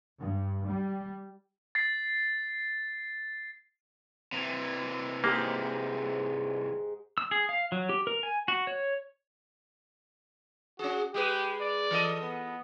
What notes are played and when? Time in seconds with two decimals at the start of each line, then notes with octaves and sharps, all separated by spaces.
0.20 G2
0.68 G3
1.75 A6 C7
4.32 C3 E3
5.24 G#2 G#3 A#3 G4
7.18 E6
7.31 G#4
7.49 F5
7.72 F#3
7.89 G4
8.07 A#4
8.23 G#5
8.48 F#4
8.67 C#5
10.79 C#4 F#4 G#4
11.14 G#3 G4 G#4 B4
11.61 D5
11.91 E3 A4 D#5
12.23 B3